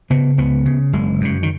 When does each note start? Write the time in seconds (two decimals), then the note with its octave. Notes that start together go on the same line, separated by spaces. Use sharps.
0.10 C#3 B3
0.38 C#2 B3
0.65 C#3
0.93 F#1 G#3
1.21 F#2 C#3
1.43 D#3